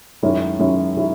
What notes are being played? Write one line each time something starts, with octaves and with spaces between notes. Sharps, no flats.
F#2 D#3 G#3 C#4 E4
F#2 D#3 G#3 C#4 E4
D#3 G#3 C#4 E4